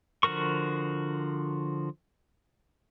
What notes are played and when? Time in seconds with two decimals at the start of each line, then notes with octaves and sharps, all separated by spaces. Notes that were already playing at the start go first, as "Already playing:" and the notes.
0.23 D3 F3 F#4 A#4 C#6